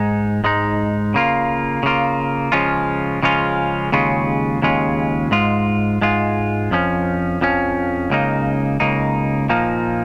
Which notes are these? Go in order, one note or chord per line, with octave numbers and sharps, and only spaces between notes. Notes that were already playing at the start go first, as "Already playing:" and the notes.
Already playing: G#2 G#3 D#4
G#2 G#3 D#4
C#3 A#3 F4
C#3 A#3 F4
C#3 F3 G#3 C#4 F4
C#3 F3 G#3 C#4 F4
D#2 C#3 G#3 C#4 F4
D#2 C#3 G#3 C#4 F4
G#2 G#3 F4
G#2 G#3 F4
F2 F3 C#4
F2 F3 C#4
C#2 C#3 A#3 D#4
C#2 C#3 A#3 D#4
A#2 F3 A#3 D#4